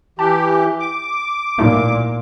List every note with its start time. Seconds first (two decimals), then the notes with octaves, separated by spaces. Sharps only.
0.19 E3 G4 A5
0.80 D6
1.59 A#2 A3 D#4 E4